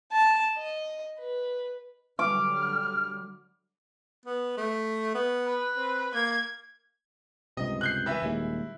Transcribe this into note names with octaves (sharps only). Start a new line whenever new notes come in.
A5
D#5
B4
D3 F#3 G3 D6 F6
B3
A3
B3
B4
C4
A#3 G#6
C#2 G2 C3 D#5
F#6 G6 C7
E3 B4 E5
D#1 D#2 G#3 E4